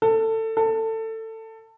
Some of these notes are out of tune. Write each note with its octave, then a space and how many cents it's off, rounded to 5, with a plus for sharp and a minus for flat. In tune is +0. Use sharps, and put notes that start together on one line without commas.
A4 +20
A4 +20